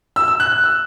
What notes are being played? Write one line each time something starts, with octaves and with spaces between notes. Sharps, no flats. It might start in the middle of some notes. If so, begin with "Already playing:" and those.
E6
E6
F#6
F#6
E6